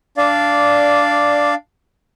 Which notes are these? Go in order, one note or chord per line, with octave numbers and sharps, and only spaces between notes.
D4 D5 F5